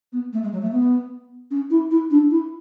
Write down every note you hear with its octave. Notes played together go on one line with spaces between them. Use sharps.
B3
A3
G#3
F#3
A3
B3
C#4
E4
E4
D4
E4